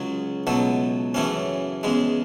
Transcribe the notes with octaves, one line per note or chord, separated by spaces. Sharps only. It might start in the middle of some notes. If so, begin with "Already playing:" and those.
Already playing: C#2 C#3 F#3
C#2 B2 F#3 A3
F#2 C#3 E3 A3 C#4
E2 C#3 G#3